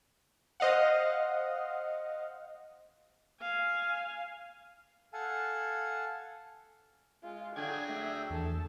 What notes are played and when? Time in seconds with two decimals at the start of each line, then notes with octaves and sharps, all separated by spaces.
0.60 C5 D#5 F5 F#5
3.41 F5 G#5
5.13 A4 F5 F#5 G#5 A5
7.23 G#3 F4
7.56 D3 F#3 G#4 D5 G5 G#6
7.89 D2 E5
8.30 E2 A4 A5